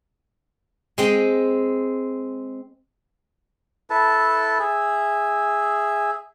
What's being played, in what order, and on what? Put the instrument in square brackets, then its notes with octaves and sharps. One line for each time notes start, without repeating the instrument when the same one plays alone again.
[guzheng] G#3 C4 D#5
[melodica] E4 A4 B4 A5
G#4 E5